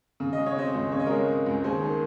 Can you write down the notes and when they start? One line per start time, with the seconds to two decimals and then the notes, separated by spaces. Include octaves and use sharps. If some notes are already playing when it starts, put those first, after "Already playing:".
0.20 C#3
0.33 D#5
0.38 G#3
0.46 C#5
0.56 C4 C5 D#5
0.74 C#2
0.91 C#3 C#5
1.00 D#5
1.06 G#3 A#4 C#5
1.28 C4
1.46 C#2
1.64 D#2 G#4 C5
1.82 D#3